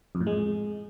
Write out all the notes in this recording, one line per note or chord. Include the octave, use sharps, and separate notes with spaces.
F2
A2
G#3